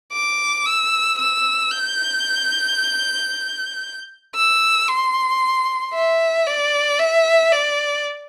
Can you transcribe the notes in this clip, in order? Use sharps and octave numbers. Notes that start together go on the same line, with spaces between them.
D6
E6
E6
G6
E6
C6
E5
D5
E5
D5